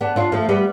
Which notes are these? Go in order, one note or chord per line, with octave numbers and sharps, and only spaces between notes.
B3 D4
D4 F4
F3 A3
G3 B3